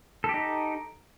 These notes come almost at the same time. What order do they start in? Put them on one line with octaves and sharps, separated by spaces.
A4 G4 D#4